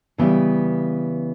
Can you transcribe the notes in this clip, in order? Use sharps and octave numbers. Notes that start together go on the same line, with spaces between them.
C#3 E3 G3 B3